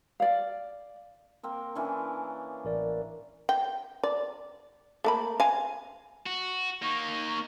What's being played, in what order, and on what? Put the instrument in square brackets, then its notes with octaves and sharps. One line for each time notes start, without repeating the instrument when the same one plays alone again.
[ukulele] D5 F5
[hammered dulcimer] A#3 C4 A#4
E3 C#4 D4
[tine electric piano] A1 A#4 D5
[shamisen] G5
D5
A3 A#3 B5
F5 G#5
[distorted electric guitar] F#4
[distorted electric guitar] A#3 D#4 [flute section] C#6